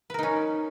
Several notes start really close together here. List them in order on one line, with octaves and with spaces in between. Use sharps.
B4 A#4 D#4 C#4